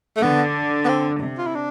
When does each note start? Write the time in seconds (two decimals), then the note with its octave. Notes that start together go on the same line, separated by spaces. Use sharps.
0.17 A3
0.22 D3 B3
0.85 B3
0.89 C4
1.21 C3
1.38 F4
1.47 E4
1.55 D4